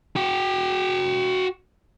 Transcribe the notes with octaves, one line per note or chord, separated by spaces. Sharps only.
F#4 G5